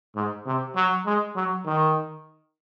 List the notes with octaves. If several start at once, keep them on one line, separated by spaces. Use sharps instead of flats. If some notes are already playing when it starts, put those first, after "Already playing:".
G#2
C3
F#3
G#3
F#3
D#3